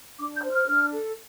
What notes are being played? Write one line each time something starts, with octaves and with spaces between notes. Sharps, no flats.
D4 D6
G6
C5
F6
D4
A4